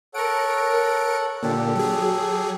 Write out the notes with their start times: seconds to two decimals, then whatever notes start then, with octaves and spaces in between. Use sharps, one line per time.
0.14 A4 A#4 C#5 F#5 D7
1.43 A#2 D3 G4 A4
1.75 F#3 G#4